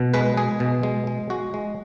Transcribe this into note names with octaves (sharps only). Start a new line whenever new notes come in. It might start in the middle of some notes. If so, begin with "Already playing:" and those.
Already playing: B2
G#3 B4
G#3 G#4
B2
G#3
G#3
G#3 F#4
G#3